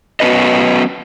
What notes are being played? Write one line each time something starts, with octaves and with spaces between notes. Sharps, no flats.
F#3 B3 C#4 B4 D#5